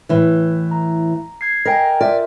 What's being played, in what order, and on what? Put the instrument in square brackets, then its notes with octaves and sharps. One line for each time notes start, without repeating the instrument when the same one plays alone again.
[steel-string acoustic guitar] A2 E3
[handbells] A#5
G#6 C7
[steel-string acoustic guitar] A#4 [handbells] D#5 G5 G#5
[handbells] F4 A#4 E5 [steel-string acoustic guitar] D5